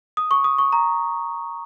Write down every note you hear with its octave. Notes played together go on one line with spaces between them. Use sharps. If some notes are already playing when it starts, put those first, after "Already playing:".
D#6
C#6
D#6
C#6
A#5